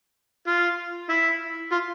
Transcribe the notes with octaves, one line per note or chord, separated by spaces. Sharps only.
F4
E4
F4